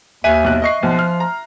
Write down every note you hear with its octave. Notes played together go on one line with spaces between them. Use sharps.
D#2 E5 G#5 F#6 D#7
B1 F#6
D#5 C#6 C7
B1 F3
F6
A#5